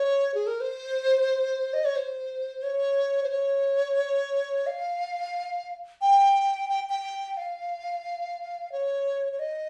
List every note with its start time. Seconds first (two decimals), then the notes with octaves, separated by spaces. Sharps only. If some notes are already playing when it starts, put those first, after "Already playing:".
Already playing: C#5
0.34 G#4
0.47 A#4
0.60 C5
1.74 D#5
1.85 C#5
1.96 C5
2.63 C#5
3.23 C5
3.30 C#5
4.67 F5
6.01 G5
6.70 G5
6.89 G5
7.37 F5
8.72 C#5
9.32 C#5
9.39 D#5